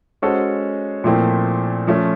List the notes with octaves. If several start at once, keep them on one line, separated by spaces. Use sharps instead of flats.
G#3 C#4 F#4 A4 C5
A#2 F3 A3 C4 E4
F3 A3 C#4